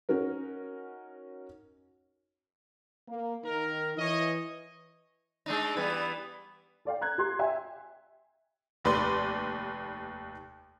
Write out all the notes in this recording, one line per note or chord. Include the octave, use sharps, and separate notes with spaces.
C#4 D#4 F#4 A#4
A#3
D#3 A#4
E3 C#5 D#5
G#3 D4 D#4
E3 G3 B3
A4 D5 F5 G5
A#5 F#6 G#6
G4 A#5 C6 F#6
E5 G5 G#5
F1 D#2 B4 D5 C6